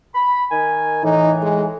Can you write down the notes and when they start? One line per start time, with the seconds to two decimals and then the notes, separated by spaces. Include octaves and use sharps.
0.15 B5
0.51 D#3 G#5
1.03 A2 E3 D#4
1.42 G#3